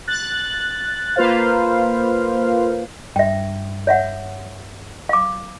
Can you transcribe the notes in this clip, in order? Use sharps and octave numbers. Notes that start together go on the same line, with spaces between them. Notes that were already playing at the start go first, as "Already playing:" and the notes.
F#6 A6
A#3 F4 B4 C5 F5
G2 E5 G5
C#5 E5 F#5
F5 D6